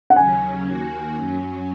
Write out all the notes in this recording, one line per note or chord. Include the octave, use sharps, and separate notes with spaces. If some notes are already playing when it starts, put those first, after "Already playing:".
F#5
D#2 C#3 F#3 C#4 G#5
D#2 D#3 A#3 F#4
F#2 F#3 C#4